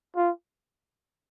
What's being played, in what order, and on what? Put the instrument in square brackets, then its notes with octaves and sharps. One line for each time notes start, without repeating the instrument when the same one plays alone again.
[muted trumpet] F4